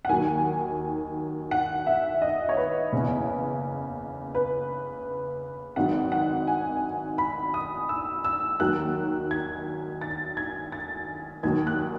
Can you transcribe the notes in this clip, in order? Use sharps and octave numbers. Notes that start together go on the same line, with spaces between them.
F#5
D#2 D#3 F#3 G#5
F#5
E5
D#5
C#5
B4
F#1 E2 C#3
B4
G#1 G#2 D#3 F#3 F#5
F#5
G#5
B5
D#6
E6
E6
D#2 D#3 F#3 F#6
G#6
A6
G#6
A6
D#2 D#3 F#3 G#6
F#6